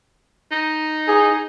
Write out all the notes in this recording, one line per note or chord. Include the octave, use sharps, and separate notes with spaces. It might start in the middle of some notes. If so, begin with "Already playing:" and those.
D#4
G#4